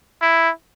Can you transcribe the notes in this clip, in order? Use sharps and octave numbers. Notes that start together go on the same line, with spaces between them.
E4